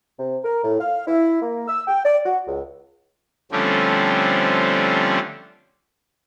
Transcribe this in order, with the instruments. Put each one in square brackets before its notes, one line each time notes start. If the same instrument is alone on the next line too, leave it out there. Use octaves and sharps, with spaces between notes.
[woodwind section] C3
A#4
A2
F5
E4
A#3
E6
G5
D5
F#4
C#2
[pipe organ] D3 F3 G3 A3 C4 C#4